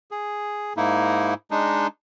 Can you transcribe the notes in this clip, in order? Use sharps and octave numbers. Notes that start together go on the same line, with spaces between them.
G#4
G#2 A#3 D#4 E4
G#3 D4 D#4